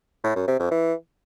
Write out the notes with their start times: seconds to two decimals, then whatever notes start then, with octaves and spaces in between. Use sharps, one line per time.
0.24 A2
0.36 F#2
0.48 C3
0.59 F2
0.71 E3